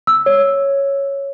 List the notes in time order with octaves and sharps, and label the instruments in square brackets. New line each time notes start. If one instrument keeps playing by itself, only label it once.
[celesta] E6
C#5